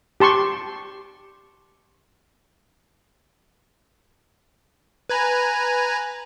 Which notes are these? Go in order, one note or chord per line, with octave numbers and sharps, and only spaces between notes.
G4 A5 C6 C#6
B4 G#5 A#5